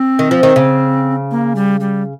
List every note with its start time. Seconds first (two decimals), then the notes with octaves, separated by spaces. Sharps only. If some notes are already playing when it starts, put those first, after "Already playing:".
Already playing: C4
0.19 D#3
0.31 F3
0.43 D#3
0.56 C#3
1.31 A#3
1.55 G3
1.80 G3